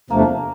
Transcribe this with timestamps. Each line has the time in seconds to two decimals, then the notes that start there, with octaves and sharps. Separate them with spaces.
0.10 E2 C3 F3 A3 A#3 D4